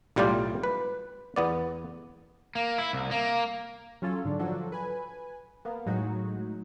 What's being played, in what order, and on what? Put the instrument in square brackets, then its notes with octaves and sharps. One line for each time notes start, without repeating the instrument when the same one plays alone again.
[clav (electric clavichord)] B1 A2 G3 F4 D5 G5
B4
E2 B3 D5
[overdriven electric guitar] A#3
E4
C2
A#3
[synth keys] F#3 C#4 F4 A4 C#5
G#2 D3 D4
F3 F#3 D4 F#4 A4
B4 G#5
A#3 B3
A2 F#3 G#3 D#4 F#4